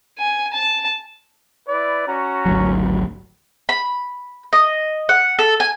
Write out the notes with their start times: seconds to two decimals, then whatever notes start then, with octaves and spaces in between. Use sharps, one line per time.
0.18 G#5
0.53 A5
1.68 E4 B4 D5
2.07 C#4 F#4 A#5
2.46 G#1 D2 F#3
3.69 B5
4.53 D#5
5.09 F#5
5.39 A4
5.60 G#5